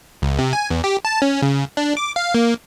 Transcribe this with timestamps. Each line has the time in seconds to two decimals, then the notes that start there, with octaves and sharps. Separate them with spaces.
0.22 C#2
0.39 C3
0.53 G#5
0.70 E2
0.84 G4
1.05 A5
1.22 C#4
1.42 C#3
1.77 D4
1.97 D6
2.16 F5
2.35 A#3